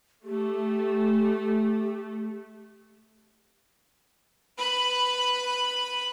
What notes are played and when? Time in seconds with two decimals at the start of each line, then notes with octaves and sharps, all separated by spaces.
0.24 A3 G4
4.58 B4 B5